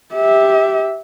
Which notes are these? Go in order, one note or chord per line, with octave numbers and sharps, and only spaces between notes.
G4 E5